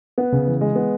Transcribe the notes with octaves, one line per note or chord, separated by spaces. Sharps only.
B3 F#5
C#3
E3
G#3
B3